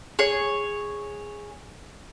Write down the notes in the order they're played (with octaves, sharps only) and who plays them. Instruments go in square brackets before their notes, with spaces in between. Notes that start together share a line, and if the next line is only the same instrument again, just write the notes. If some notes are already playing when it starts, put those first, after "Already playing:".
[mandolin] G#4 C#5